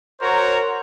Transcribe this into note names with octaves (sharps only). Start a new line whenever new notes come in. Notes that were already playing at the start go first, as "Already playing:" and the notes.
F#4 A#4 C5 C#5 A#5